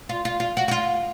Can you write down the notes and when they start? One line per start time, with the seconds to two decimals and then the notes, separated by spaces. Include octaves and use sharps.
0.09 F4
0.25 F4
0.40 F4
0.57 F#4
0.68 F#4
0.71 F4